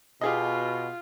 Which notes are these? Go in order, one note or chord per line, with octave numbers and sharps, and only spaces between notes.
B2 F4 G4 G#4 D#5